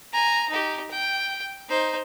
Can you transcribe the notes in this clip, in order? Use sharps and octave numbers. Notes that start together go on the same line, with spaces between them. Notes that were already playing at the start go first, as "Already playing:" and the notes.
G#5 A#5
D#4 G4
G5
D#4 C5